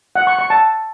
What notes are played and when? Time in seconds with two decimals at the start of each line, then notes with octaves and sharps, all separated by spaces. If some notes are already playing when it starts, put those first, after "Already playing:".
0.15 F#5
0.27 C#6
0.39 C#6
0.50 A5